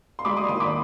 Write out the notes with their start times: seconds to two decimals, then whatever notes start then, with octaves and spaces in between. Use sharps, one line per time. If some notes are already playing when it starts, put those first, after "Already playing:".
0.19 C6
0.25 G#3 B5 D6
0.37 C6 D#6
0.48 D#2 C6 D#6
0.60 B5 D6